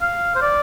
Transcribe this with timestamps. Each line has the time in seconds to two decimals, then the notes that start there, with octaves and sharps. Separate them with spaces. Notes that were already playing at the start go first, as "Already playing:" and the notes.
0.02 F5
0.35 C5
0.42 D5